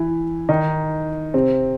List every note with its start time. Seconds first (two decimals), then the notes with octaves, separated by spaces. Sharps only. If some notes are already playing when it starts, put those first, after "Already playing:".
Already playing: E3 E4
0.49 D#3 D#4
1.34 C3 C4